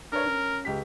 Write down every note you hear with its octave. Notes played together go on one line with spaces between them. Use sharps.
D4 A#4 B4 C#5
C#4
C#2 G4 B6